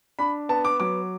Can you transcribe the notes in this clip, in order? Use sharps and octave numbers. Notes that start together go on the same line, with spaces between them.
D4 B5
B3 A5
D6
F#3 D6